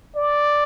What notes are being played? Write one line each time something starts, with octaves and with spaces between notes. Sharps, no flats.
D5